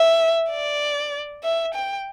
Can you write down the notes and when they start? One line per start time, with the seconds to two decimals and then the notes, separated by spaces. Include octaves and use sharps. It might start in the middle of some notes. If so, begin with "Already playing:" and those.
Already playing: E5
0.50 D5
1.44 E5
1.74 G5